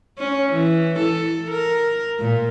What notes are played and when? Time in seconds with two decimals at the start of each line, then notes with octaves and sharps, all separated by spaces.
0.19 C#4
0.53 E3
0.99 A4
1.51 A#4
2.20 A#2